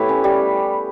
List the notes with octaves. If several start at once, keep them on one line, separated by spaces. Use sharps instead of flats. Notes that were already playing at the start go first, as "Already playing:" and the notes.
Already playing: A2 B3 E4 G4 B4 C#5
C#4
G3